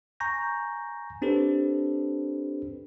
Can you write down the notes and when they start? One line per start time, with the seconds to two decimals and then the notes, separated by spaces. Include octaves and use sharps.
0.20 G#5 A#5 C#6 G6 A#6
1.22 C4 D4 G4 A4 B4 C5